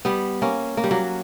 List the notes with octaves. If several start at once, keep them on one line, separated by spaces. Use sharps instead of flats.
G3 B3
A#3 C#4
A#3
G3
F#3 A#3